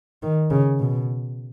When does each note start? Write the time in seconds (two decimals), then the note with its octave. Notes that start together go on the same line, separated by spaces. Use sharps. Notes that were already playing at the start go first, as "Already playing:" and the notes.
0.23 D#3
0.51 C#3
0.80 B2